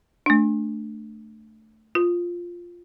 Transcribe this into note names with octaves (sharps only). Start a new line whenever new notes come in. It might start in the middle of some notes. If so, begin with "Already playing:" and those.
A3 D4
F4